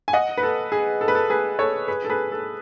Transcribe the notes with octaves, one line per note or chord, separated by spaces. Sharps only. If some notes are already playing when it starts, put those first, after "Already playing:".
G#5
D#5 F#5
B4
A4
G#4
A4
B4
A4
G#4 B4
A4 C#5
G#4 B4
A4
G#4 B4
A4